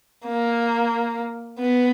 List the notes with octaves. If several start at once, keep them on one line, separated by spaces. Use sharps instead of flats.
A#3
B3